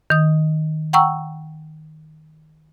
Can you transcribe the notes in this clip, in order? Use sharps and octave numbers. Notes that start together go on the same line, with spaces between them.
D#3 D#6
F#5 G5 A#5 C#6 E6